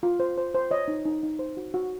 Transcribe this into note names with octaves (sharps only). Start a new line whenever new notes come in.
F4
C5
C5
C5
C#5 D#5
D#4
D#4
D#4
C5
F#4
F#4